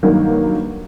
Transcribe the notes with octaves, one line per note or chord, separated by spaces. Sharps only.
G2 D#3 F#3 A#3